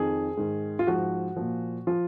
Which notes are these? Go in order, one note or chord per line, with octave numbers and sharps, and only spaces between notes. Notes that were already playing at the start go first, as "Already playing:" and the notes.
Already playing: F2 D#3 G#4
G#2 D#3
F4
G#2 F3 F#4
A#2 F3
F3 F4